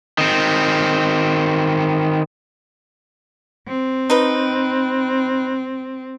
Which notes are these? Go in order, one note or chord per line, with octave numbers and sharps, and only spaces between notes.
D#3 C4
C4
D#4 B4